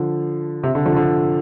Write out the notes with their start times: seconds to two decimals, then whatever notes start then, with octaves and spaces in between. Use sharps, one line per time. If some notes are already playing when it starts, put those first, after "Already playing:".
Already playing: D3 F3
0.63 C3
0.75 D3
0.85 D3 F3
0.96 D3